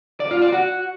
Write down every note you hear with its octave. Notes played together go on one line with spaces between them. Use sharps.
D5
F4
D5
F#4